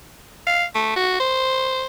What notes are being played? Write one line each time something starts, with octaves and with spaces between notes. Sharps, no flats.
F5
A3
F#4
C5